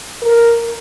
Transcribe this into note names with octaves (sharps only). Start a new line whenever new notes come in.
A#4